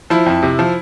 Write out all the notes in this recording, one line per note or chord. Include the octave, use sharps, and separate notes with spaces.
F3 E4
F2
C3
F3